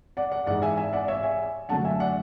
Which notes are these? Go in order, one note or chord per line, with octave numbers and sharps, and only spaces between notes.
D5 F#5
D5 F#5
G#2 E3 G#3 D5 F#5
E5 G#5
E5 G#5
D5 F#5
D5
C#5 E5
E5 G#5
D3 F#3 A3 D4 F#5 A5
E5 G#5
D5 F#5